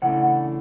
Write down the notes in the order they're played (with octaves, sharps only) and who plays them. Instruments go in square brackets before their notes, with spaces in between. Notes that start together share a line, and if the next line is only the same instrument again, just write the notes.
[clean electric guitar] C#3 E3 A3 D4 F#5